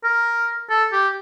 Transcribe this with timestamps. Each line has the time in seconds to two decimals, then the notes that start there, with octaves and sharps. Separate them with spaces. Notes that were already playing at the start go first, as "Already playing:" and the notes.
0.04 A#4
0.70 A4
0.92 G4